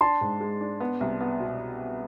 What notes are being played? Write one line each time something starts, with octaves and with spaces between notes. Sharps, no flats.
D4 A5 C6
G#2
G#3
D4
B3
C2
B3
B2